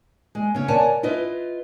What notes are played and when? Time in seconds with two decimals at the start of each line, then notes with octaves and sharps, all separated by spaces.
0.35 G#3
0.55 C#3 C#4
0.68 A#4 C#5 D5 F#5 G#5 A5
1.03 E4 F4 B4 D#5